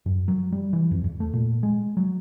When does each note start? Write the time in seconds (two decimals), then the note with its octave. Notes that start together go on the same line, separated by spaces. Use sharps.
0.06 F#2
0.28 F#3
0.52 G3
0.73 E3
0.91 F2
1.04 E2
1.20 A3
1.33 A#2
1.63 G#3
1.97 F#3